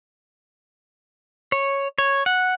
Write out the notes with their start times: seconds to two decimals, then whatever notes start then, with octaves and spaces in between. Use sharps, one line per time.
1.52 C#5
1.98 C#5
2.26 F#5